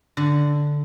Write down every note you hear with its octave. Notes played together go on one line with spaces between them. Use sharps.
D3